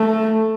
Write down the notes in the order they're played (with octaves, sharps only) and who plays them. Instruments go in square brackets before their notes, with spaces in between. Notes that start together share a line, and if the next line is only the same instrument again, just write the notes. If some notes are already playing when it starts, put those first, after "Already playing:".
Already playing: [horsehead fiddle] A3